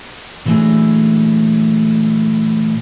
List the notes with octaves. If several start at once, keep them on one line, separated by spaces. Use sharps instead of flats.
A#2 E3 F#3 A3 D4 G#4